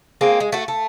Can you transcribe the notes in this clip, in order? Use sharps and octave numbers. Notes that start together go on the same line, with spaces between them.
G#3 A#3 C4
G#3
A3 F#4
A3